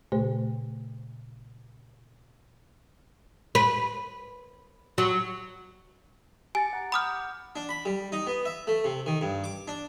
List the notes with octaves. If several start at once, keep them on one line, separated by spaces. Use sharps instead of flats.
A#2 C#3 A3 G4 C5
B4
F#3
G4 G#5 A6 C#7
F#5 A#5
F#5 B5 D6 D#6 F6 G6
D4
B5
G3
D#4
B3
E5
A3
C3
D#3
G2
D6
D4